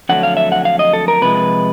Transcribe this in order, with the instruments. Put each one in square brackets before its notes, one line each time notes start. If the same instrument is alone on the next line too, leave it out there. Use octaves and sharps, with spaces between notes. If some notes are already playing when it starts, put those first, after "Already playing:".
[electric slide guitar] F2 D3 F#3 A3 F#5
F5
E5
F#5
F5
D#5
A4
A#4
C3 F3 G#3 B4